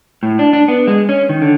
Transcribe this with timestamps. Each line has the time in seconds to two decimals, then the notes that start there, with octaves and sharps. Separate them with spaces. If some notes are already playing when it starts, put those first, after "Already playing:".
0.23 A2
0.39 D4
0.53 D4
0.68 B3
0.88 G#3
1.09 C#4
1.29 D#3
1.42 D3